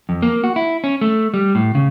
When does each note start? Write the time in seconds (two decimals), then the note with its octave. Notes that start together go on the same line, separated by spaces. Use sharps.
0.09 F2
0.22 A#3
0.44 F#4
0.56 E4
0.84 C#4
1.01 A3
1.34 G3
1.55 A2
1.75 C#3